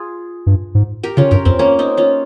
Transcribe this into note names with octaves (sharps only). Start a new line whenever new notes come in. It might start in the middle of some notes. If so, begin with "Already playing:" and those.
Already playing: F4 G#4
G2
G#2
G4 A#4
C#3 C#4 F4
G2 G4 A#4
F2 C4
A#3 C#4
C4 D#4
C#4 F4